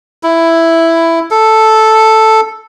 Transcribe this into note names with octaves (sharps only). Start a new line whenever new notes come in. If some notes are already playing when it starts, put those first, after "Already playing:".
E4
A4